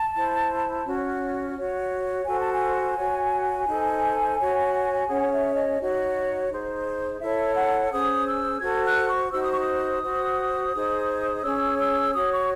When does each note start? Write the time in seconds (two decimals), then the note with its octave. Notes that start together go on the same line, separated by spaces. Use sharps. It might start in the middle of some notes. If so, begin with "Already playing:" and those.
Already playing: A5
0.15 E4 C5
0.85 C#4 F#4 C#5
1.56 F#4 C#5
2.26 F#4 A4 C5 G#5
2.38 A5
2.51 G#5
2.97 F#4 C#5
3.67 D#4 A4 C5
4.38 F#4 C#5
5.08 C#4 G#4 C#5 F#5
5.32 E5
5.55 D#5
5.79 D#4 F#4 C#5
6.49 D#4 G#4 C5
7.20 E4 A4 C#5 E5
7.55 F#5
7.91 C#4 G#4 C5 D#6
8.26 E6
8.61 F#4 A4 C5 G#6
8.85 F#6
9.08 C#6
9.32 D#4 F#4 C5 E6
9.41 D#6
9.51 C#6
9.61 D#6
10.02 F#4 C5
10.73 D#4 G#4 C5
11.43 C#4 G#4 C#5 E6
11.78 E6
12.14 F#4 C#5 D#6
12.31 C#6